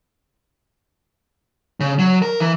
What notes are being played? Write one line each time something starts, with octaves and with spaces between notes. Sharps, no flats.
C#3
F#3
A#4
E3